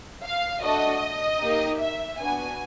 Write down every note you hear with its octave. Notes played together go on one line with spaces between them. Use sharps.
F5
A3 D4 F#4 A4 D#5
A#3 D#4 G4
E5
B3 D4 F#4 G#5